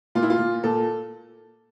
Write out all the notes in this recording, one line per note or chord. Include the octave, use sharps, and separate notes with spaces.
A#2 F4
E4
F4
A#2
A#2 A4